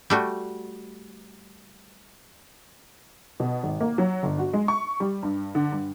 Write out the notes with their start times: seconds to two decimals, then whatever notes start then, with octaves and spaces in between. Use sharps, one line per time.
0.10 G3 A3 F#4
3.40 B2
3.63 G#1
3.81 A#3
3.98 F#3
4.23 G1
4.38 F#4
4.53 G#3
4.68 C#6
5.00 G3
5.23 G2
5.55 D3
5.72 G2